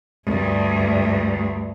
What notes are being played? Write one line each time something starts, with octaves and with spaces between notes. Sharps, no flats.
D2 G2